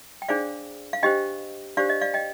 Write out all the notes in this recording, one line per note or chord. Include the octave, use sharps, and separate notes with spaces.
G5
D4 G#4 C5 D5 F5
F5
D4 G4 C5 D#5 G5
D4 G4 C5 D5 F5
D#5
D5 F5
D#5 G5